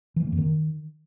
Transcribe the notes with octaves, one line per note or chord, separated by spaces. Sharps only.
E3
G3
A#3
F2
D#3